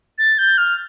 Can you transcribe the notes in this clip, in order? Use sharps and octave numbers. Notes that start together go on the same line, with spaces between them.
A6
G6
F6